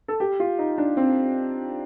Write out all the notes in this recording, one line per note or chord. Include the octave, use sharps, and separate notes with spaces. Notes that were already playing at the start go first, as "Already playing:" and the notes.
A4
G4
F4
D#4
D4
C4